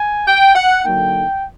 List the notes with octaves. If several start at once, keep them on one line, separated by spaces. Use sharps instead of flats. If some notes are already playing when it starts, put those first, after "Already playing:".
Already playing: G#5
G5
F#5
D3 F#3 A#3 D#4 G5